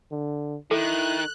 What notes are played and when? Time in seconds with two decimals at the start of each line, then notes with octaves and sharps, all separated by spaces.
0.11 D3
0.71 D#3 E4 A4 F#6